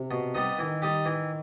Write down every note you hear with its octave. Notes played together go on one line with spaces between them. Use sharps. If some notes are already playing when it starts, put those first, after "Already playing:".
Already playing: C3
B2
G3 B3 D#4
D#3 E3
G3 D#4 G4
E3